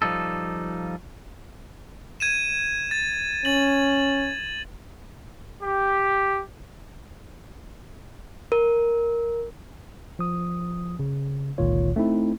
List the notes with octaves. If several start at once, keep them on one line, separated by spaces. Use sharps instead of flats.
F3 G3 D#4 A4
G#6 D#7 E7
A6
C#4 A6 F#7
G4
A#4
F3 D#6
C#3
G1 C#2 A#2 D#3 F4 C#5
A3 C4 D#4 E4